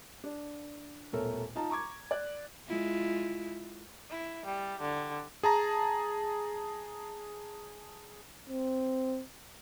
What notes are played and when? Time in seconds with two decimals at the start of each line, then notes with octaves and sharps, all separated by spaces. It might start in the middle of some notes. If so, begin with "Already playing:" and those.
0.24 D4
1.13 D#1 B2 A3 A4 A#4 C#5
1.55 D#4 F4 A5 A#5
1.70 A#5 C#6 D6 G#6
2.11 D5 F#6
2.66 G#3 E4 F4
4.10 E4
4.46 G3
4.81 D3
5.43 G#4 A5 A#5
8.50 C4